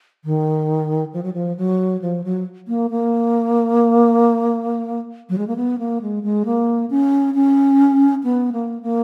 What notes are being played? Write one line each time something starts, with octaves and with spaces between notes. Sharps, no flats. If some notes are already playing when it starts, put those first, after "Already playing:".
D#3
F3
F#3
F3
F#3
F3
F#3
A#3
A#3
F#3
G#3
A#3
B3
A#3
G#3
G#3
A#3
C#4
C#4
B3
A#3
A#3